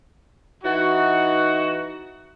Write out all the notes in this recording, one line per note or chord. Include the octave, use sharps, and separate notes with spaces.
E3 D#4 F#4